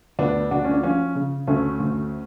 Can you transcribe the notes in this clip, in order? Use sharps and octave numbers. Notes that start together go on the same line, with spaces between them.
D2 B3 D4
D2 D4 F#4
C#4
D4
F3 C#4 F4
C#3
D2 A3 C#4
D2